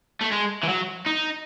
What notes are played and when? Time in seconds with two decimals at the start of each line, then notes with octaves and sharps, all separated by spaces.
0.21 A3
0.31 G#3
0.63 E3
0.69 F#3
1.06 D#4